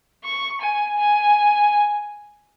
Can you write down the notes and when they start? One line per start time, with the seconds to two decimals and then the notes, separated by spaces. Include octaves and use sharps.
0.24 C#6
0.61 G#5
0.99 G#5